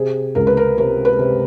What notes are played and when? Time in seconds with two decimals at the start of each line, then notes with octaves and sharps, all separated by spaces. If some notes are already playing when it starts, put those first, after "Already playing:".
Already playing: C3 G#4
0.35 C#2 A#4
0.47 B4
0.57 A#4
0.78 C3 A#4
1.05 B4
1.19 C3